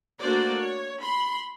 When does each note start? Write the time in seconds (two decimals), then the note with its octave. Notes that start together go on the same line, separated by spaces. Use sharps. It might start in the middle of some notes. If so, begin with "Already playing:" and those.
0.21 A3 A#3 D4 F#4 C5 D5
0.57 C#5
1.02 B5 C6